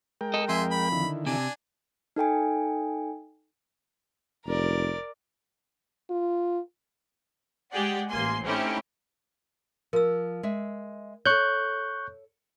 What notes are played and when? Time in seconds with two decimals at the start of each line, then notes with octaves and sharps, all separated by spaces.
0.21 G#3 A#4 G5
0.34 A4 D#5
0.49 F2 E5 G#5 C6
0.71 B5
0.92 D3 D#3 E4
1.27 C3 D4 G#5
2.16 D#4 A4 G5 G#5
4.45 F1 A#4 D5
6.10 F4
7.73 G#3 G4 G#4 D5 F#5 G5
8.09 A1 A#3 G#5 C6
8.44 A3 C4 C#4 D#4 E4 G4
9.93 F3 A#4 E6
10.43 G#3 E5
11.26 A4 C#5 C#6 F#6 G6